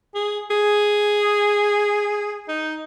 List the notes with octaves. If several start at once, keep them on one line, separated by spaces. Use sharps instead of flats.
G#4
G#4
D#4